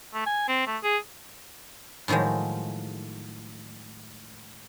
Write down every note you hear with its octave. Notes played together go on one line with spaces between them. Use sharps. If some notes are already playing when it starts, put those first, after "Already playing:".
A3
G#5
C4
A3
G#4
A2 D#3 F3 F#3 G#3